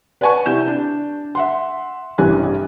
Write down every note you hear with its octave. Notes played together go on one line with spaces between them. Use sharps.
B4 D5 F#5 G#5 A5 C#6
C3 E4 G6 E7
D4
E5 F#5 C6
A1 G2 C3 E3 G#5 F#6